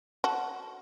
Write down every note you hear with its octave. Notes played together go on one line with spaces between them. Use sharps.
F#4 A4